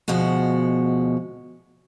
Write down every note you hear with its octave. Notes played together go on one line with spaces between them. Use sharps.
D2 B2 F3 G#3 F#4